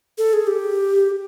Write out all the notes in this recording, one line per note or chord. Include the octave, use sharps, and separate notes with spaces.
A4
G#4
G4